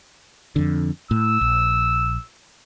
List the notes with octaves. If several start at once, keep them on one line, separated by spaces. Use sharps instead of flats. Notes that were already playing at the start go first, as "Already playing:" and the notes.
F2 D3
A2 E6
A#1